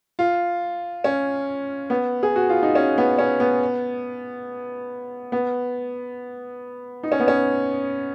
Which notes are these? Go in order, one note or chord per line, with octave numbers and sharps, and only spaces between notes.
F4
C#4
B3
G#4
F#4
F4
D#4
C#4
B3
C#4
B3
B3
D#4
C#4
B3
C#4